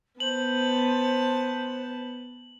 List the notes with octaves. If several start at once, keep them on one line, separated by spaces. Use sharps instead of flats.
B3 C5 A5 F#7